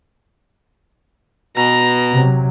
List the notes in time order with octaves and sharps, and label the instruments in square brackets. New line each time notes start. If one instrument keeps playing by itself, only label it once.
[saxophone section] B2 [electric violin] A#5
[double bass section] C3 F#3